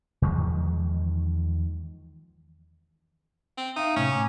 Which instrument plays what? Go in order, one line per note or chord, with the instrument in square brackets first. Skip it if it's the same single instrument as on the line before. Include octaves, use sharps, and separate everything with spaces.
[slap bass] E2 D#3 F3 G#3
[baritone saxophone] C4
[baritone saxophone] D#4 [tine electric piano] E5 F5
[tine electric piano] A2 C3 A3 [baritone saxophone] C#4
[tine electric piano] G#5 A#5 D6